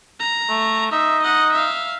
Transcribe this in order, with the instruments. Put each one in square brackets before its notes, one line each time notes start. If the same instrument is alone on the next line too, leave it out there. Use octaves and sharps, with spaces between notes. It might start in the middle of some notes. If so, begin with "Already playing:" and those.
[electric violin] A#5
[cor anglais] A3
[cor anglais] D#4 [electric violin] E5
[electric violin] D#5 F#5
E5 F5